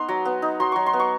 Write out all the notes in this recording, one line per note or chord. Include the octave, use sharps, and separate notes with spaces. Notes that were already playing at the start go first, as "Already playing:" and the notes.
Already playing: B3 D#4 C6
F#3
B3
D#4
F#3 C6
F#3 C#6
C6
B3
C#6